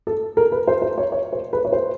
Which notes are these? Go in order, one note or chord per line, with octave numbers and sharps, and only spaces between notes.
A4
A#4
B4
C5
C5
C#5
C#5
C5
B4
C#5
C5